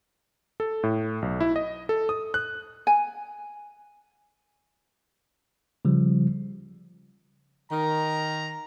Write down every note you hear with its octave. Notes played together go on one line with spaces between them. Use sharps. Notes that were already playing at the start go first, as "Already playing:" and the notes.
A4
A2
B1
E4
D#5
A4
D#6
F#6
G#5
C#3 F3 G3
D#3 A#5